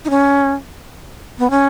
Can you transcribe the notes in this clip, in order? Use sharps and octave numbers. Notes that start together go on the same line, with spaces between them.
D#4
C#4
B3
C#4